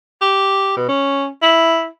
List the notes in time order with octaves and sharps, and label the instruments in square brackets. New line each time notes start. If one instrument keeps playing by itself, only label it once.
[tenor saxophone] G4
B2
C#4
E4